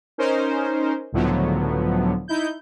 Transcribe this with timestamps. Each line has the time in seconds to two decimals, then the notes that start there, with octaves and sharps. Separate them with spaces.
0.18 C#4 D#4 A#4 C5
1.12 C#2 A2 D3 F3 F#3 B3
2.28 D#4 E4 G6